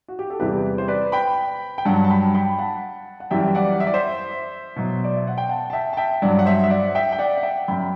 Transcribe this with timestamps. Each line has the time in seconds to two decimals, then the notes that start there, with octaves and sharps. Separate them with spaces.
0.08 F#4
0.19 G4
0.30 A4
0.40 E2 C3 E3 G3 G4 B4
0.78 C5
0.88 B4 D5
1.12 G5 B5
1.78 G5
1.85 G2 F#3 F#5 A5
2.04 A5
2.10 G5 B5
2.34 G5 B5
2.58 F#5 A5
3.20 F#5
3.31 F#2 E3 G3 E5 G5
3.55 D5 F#5
3.80 E5
3.87 D5
3.94 C5 E5
4.76 B2 F#3
5.04 D5
5.15 E5
5.27 F#5
5.38 G5
5.49 F#5 A5
5.70 A5
5.73 E5 G5
5.93 A5
5.97 E5 G5
6.22 G2 F#3 D5 F#5
6.39 F#5
6.46 C5 E5
6.63 E5
6.70 D5 F#5
6.95 E5 G5
7.12 G5
7.19 D5 F#5
7.38 F#5
7.43 E5 G5
7.68 F#2 F#3 G5 B5